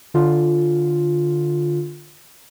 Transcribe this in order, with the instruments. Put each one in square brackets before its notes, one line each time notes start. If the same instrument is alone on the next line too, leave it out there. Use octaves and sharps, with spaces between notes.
[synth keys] D3 F4